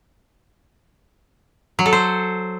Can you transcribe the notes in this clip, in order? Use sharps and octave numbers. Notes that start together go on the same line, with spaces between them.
F#3
A4
C5